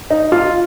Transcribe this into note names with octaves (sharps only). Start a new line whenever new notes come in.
D#4
F4